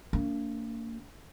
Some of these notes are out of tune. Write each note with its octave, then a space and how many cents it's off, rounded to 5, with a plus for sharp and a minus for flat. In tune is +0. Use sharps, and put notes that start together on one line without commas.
A#3 -35 D4 -40